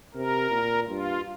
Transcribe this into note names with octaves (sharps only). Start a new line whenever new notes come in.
C3 A#4
A#2
G2 F4